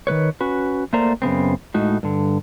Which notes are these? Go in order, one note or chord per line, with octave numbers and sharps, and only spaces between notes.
D#3 G3 B4 C#5
C#4 F#4 B4
A3 A#3 A#4 C5 D5 A#5
F#2 C#3 B3 C4
A2 G#3 D#4 F#4
G2 D3